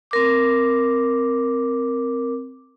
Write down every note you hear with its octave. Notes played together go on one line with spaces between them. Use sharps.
C4 A#4 D6